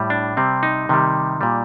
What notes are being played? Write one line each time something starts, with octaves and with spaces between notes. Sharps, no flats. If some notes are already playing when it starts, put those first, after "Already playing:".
Already playing: A2 G3
D4
C3 G3 C4
D#4
C3 D#3 G3
A#2 G3